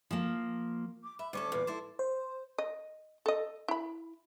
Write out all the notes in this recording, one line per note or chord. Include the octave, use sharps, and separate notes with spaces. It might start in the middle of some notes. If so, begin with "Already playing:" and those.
F3 A#3
D6
E5 B5
D2 C#4 A4 D6
E2 A#2
E4 A4 C5
C5
D#5
A4 D#5
E4 B5